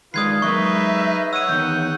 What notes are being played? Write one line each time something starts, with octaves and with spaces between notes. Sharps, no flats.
D#3 G#3 D4 F4 B4 D#6 G#6 C7
F#3 G#3 A#3 D#4 B4 E5 C#6
C#5 F#5 E6 D#7
E2 D#3 G6